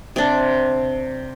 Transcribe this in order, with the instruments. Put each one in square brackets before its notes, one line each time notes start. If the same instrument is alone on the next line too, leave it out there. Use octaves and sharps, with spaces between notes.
[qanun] C3 D4